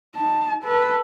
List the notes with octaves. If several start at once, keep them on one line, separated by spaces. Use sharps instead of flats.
D#4 A5
A4 B4